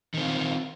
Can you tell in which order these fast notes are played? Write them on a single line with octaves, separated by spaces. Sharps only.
D#3 C4 F4